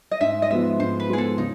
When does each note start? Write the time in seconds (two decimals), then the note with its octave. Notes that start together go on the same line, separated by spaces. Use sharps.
0.11 D#5
0.21 G#2 E5
0.42 D#5
0.50 F3 G#3 B3 E5
0.80 G#2 C5
1.00 B4
1.09 F3 G#3 B3 G#4
1.18 A4
1.38 C#3 D#4